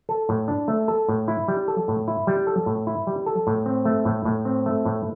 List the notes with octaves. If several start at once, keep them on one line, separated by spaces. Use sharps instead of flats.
A4
A2
D4
A3
A4
A2
E4
G3
A4
A2
E4
G3
A4
A2
E4
G3
A4
A2
C4
A3
A2
A2
C4
A3
A2